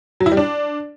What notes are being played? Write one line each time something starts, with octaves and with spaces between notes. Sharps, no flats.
F#3
E4
G3
D4